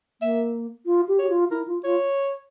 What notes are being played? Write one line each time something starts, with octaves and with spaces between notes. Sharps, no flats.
A#3 E5
F4
G4
G4 C#5
F4
E4 A#4
F4
F4 C#5